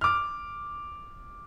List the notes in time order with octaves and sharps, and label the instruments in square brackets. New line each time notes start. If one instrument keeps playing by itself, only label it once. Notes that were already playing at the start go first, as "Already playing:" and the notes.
[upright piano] D6 F6